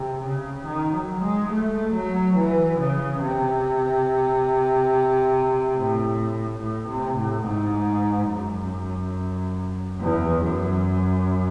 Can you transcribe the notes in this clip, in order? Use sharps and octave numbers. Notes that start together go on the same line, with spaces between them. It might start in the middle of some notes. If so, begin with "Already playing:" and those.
Already playing: C3
C#3
D#3
F#3
G#3
A3
F#3
E3
C#3
C3
A2
A2
C3
A2
G#2
F#2
E2
F#2